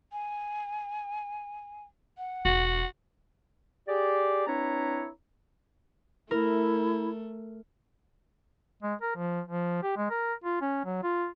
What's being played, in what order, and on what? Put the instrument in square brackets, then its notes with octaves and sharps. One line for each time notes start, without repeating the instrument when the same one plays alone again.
[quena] G#5
F#5
[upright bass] E1 [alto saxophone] F#4
[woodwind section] G4 G#4 D5
C4 D4 E4 B4 C#5 A#5
[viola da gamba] A3 [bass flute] E4 [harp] A#4
[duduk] G#3
A#4
F3
F3
G4
G#3
A#4
F4
C#4
F#3
F4